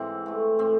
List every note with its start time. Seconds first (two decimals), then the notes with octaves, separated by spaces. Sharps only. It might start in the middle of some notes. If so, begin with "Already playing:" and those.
Already playing: G#2 E3 C4
0.26 E3 A3
0.59 A2 C4